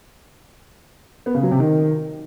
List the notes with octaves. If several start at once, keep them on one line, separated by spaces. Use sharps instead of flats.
B3
C#3
F#3
C3
D#3